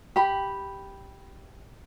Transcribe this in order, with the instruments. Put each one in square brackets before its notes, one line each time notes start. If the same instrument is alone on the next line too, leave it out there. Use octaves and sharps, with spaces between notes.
[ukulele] G4 B5